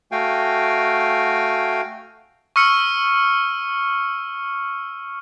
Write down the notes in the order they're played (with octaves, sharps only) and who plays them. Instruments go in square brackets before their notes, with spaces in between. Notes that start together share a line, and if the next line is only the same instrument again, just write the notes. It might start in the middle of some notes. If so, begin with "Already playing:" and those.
[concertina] A3 F#4 F5 G5 G#5
[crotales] C#6 E6 F6 C#7